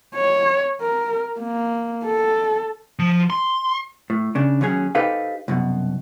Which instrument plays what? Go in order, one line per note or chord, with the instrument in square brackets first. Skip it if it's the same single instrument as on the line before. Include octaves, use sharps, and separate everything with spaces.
[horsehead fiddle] C#5
A#4
A#3
A4
[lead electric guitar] F3
C6
[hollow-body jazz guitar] A2
C#3 D4
D#2 F#3 C#4 G#4
D#4 G4 A4 B4 C5 F5
C2 F#2 B2